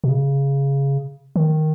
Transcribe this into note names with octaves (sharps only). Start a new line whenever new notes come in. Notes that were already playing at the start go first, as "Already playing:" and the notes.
B2
C#3
D#3